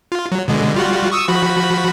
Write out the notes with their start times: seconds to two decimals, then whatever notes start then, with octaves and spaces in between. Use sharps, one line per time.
0.12 F4
0.32 F#3
0.48 B2 D3 G#3
0.74 G3 F4 F#4
1.12 C#6 D#6 E6
1.28 F3 F#4 B5